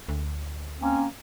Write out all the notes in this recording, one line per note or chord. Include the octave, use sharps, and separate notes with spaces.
D2
A#3 C4 C#4